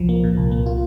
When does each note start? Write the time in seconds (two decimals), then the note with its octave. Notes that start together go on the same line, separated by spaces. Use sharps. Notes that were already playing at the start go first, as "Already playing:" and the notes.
Already playing: C2 A#2 F3
0.09 A#3
0.24 A#2
0.37 C2
0.51 A#3
0.66 F4